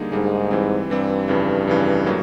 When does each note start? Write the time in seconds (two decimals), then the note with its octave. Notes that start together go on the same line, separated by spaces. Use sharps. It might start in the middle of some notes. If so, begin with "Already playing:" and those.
Already playing: D3 G3 A#3 D#4 G#4
0.12 G#2 D3 G3 A#3 D#4 G#4
0.51 E3 G3 C4
0.90 G2 E3 G3 C4
1.28 F2 C#3 E3
1.67 F2 C#3 E3
2.06 A2 F#3 A#3